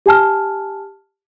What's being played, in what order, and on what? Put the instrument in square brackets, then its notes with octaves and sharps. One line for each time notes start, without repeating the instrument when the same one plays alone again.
[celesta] G4 G#5 A5 F6